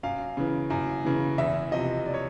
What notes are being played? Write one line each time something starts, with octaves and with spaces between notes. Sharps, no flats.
F#2 F5
C#3 E3
F#2
C#3 E3
E2 E5
C3 F3 D#5
D5
C#5